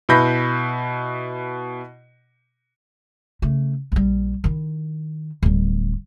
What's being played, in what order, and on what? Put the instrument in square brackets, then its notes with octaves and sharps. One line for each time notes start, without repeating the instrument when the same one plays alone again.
[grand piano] B2 E4 B4 B5 G6 A#6
[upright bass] C#3 A3
A#1 G3
D#3 E4
D1 G3